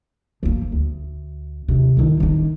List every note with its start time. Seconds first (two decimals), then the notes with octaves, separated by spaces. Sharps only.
0.43 F3 A#3
0.72 D2
1.68 D#2 C3
1.97 D#3 E4
2.20 D#3 C#4